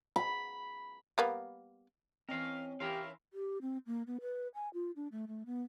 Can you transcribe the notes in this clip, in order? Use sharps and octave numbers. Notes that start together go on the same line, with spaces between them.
B5
G3 A#3 B3
E3 C4 C#4 A#4 D#5 F5
E3 C#4 E4 G4 A#4 F5 C6
G4
C4
A#3
B3
B4
G#5
F4
D4
A3
A3
B3